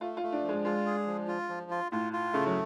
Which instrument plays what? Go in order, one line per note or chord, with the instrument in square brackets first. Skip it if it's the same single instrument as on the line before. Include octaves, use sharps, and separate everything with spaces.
[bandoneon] A3 [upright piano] F4
[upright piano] F4
[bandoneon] A3
[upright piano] D4
[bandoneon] F3
[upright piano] G#3
[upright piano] G#3 [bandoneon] F4
[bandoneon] G#4
F3
F4
F3
F4
[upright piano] A2 [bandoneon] F4
[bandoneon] F4
[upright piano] C#3 [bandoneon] A3
[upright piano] F#3